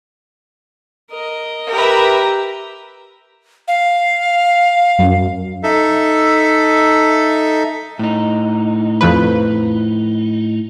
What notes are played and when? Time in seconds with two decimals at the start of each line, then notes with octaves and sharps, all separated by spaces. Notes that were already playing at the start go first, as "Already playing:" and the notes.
1.11 A#4 D#5
1.71 G4 A#4 B4 E5 A#5
3.68 F5
4.99 F#2
5.63 D#4 A4 E5
7.99 A2 D#4
9.01 F2 F3 B4